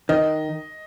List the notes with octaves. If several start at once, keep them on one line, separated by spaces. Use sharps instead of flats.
D#3 D#5